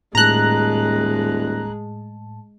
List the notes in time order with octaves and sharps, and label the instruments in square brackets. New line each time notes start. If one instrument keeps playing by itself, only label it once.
[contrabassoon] D#1 [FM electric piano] A2 A5 [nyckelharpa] G#3 [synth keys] A#5 F#6